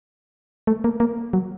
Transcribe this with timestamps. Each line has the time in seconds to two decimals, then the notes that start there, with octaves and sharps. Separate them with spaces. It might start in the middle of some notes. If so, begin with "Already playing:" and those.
0.67 A3
0.84 A#3
1.00 A#3
1.33 F#3